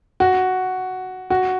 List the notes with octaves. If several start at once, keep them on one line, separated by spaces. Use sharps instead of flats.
F#4
F#4